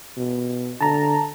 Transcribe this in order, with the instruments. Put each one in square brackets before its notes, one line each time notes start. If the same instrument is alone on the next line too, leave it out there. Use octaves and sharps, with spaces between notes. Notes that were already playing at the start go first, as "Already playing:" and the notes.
[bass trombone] B2
[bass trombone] D3 [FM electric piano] A5 A#5